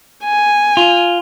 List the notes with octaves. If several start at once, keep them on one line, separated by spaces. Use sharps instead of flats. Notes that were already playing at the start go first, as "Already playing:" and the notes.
G#5
F4